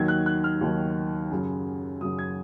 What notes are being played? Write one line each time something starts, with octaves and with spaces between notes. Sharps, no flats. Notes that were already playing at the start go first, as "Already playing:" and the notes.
Already playing: D#2 D#3 F#3 G#6
F#6
F#6
F6
D#2 D#3 F#3
F#2 C#3 F#3
F#2 C#3 F#3 D#6
G#6